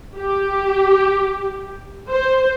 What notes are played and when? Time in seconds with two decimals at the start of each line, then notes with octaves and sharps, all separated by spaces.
0.18 G4
2.09 C5